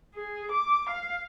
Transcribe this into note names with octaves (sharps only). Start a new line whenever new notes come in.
G#4
D6
F5